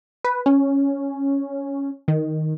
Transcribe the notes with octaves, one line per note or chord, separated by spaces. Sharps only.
B4
C#4
D#3